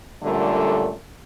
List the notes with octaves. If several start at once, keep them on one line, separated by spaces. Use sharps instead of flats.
F#2 A#2 D3 G3 A3